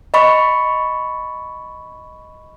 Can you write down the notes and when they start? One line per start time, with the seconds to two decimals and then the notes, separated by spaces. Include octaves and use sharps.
0.14 D#5 B5 C#6